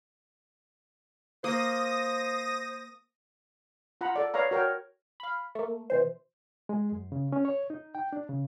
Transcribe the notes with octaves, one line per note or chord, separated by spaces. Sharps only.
A#3 C5 D#6 A#6
F4 F#5 A#5 B5
A4 D5
B4 C#5 D5 F5 A#5
F#4 A#4 C#5 G5
F5 B5
A3 A#3
B2 E3 C5
G#3
F#2
C#3
C#4
C#5
D#4
G5
D4
C#3